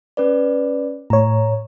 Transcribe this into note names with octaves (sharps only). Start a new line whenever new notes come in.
C#4 B4 D5
A2 C#5 A#5